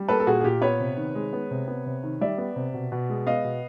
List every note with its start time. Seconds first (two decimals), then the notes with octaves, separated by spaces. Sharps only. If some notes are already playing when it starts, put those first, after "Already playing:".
Already playing: G3
0.08 A#3 A4 B4
0.20 A4
0.26 A#2 F#4 G#4
0.41 G#4
0.44 A#2 G4
0.61 B3 B4 C#5
0.80 C3
0.97 D#3
1.15 G#3
1.33 B3
1.51 C3
1.68 B3
1.86 C3
2.03 D#3
2.21 G3 D5 E5
2.38 B3
2.56 C3
2.74 B2
2.92 B2
3.09 G#3
3.26 B3 D#5 F5
3.44 B2